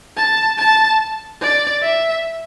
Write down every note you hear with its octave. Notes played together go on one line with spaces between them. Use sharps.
A5
A5
D5
E5